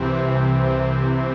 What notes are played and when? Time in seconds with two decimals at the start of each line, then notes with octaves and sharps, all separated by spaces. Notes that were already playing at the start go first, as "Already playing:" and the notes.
Already playing: C2 C3 E3 C4
0.15 C3
0.41 C2
0.68 E3